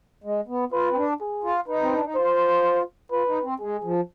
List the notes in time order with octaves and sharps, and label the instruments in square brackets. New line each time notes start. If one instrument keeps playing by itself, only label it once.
[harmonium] G#3
B3
[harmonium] F4 [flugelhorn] B4
[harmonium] C4
D4
[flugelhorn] G#4
[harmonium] F4
[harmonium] D#4 [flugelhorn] B4
[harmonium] C4
D4
D#4
[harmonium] F4 [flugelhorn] C5
[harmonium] F4 [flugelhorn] B4
[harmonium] D#4
C4
[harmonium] G#3 [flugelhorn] G#4
[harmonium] F3